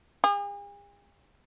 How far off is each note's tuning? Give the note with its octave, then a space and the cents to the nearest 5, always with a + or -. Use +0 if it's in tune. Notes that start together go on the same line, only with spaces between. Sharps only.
G#4 -45